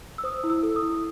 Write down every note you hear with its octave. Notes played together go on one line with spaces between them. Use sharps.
E6
C5 D#6
E4
E6
A4
D#6
E4